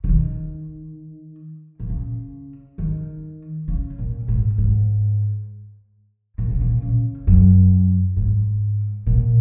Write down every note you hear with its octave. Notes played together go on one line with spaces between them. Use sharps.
C#3
D#3
A#2
C#3
D#3
C#3
A#2
G#2
G#2
A#2
C#3
A#2
C#3
F#2
G#2
A#2